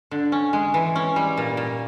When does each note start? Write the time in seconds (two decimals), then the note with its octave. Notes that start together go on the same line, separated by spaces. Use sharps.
0.11 D3
0.32 C#4
0.53 G#3
0.74 E3
0.95 C#4
1.16 G3
1.37 A#2
1.57 A#2